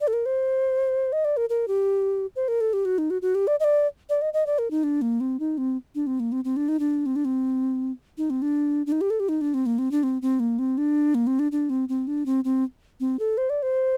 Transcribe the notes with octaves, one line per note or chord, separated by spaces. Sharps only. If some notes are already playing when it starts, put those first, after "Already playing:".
D5
A4
A#4
C5
D#5
D5
A#4
A#4
G4
C5
A#4
A4
G4
F#4
D#4
F#4
F#4
G4
D5
D#5
D5
D5
D#5
D#5
D5
A#4
D#4
D4
A#3
C4
D#4
C4
D4
C4
A#3
C4
C4
D4
D#4
D4
C4
D4
C4
D#4
C4
D4
D4
D#4
G4
A4
G4
D#4
D4
C4
A#3
C4
D4
C4
C4
A#3
C4
D4
A#3
C4
D4
D4
C4
C4
D4
C4
C4
C4
A4
C5
D5
C5